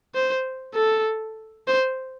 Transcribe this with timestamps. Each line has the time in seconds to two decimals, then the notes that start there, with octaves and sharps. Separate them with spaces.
0.15 C5
0.75 A4
1.67 C5